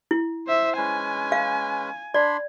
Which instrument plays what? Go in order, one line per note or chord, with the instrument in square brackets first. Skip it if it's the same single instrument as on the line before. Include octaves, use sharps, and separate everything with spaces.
[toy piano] E4
[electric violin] C5 E5
[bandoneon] G#3 C#4 B4 [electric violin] G#5
[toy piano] F5
[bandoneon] D4 B5 C6 [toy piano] D5